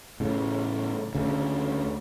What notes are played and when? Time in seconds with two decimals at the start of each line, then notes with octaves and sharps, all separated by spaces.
0.20 A2 C#3
1.15 D2 C#3